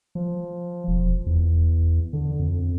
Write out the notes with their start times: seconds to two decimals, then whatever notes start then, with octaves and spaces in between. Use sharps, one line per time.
0.15 F3
0.88 E1
1.26 E2
2.13 D3
2.39 F2